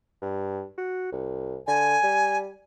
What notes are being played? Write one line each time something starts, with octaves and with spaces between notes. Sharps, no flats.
G2
F#4
C2
D3 G#5
G3